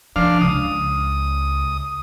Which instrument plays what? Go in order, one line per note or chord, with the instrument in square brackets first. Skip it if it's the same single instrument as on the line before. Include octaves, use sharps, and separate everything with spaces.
[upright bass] F3 [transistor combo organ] D4 F5
[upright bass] C#2 C#3 [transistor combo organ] D#6